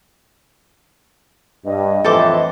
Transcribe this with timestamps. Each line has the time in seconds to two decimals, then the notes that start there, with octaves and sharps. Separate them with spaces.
1.66 G2 D#5
2.04 F2 A2 E3 A4 C5 D6